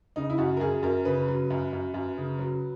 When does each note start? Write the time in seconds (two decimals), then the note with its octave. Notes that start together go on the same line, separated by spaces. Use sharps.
0.16 C#3 D#4
0.30 E4
0.38 F#2 F#4
0.57 A#4
0.60 F#2 G#4
0.83 F#2 A#4
1.05 C#3 B4
1.28 F#3
1.50 F#2
1.73 F#2
1.94 F#2
2.18 C#3
2.39 F#3